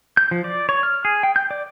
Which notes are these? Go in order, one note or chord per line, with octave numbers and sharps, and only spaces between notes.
G6
F3
D5
C#5
F6
G#4
G5
G6
D5